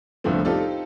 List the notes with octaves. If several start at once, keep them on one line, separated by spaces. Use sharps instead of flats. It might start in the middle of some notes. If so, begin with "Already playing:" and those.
C2 A2 D3 F3 B3 C4
C4 D#4 F4 G4 A4 D5